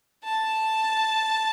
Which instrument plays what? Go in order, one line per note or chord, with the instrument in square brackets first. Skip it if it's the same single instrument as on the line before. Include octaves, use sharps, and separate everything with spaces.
[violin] A5